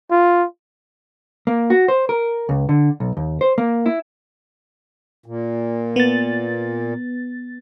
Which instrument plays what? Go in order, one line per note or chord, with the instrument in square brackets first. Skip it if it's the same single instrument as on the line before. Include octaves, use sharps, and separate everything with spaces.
[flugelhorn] F4
[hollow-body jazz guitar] A#3
F#4
C5
A#4
C#2
D3
B1
D#2
C5
A#3
E4
[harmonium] A#2
[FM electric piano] B3 A6